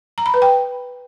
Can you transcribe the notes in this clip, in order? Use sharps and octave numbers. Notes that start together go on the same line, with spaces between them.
A#5
B5
B4
G5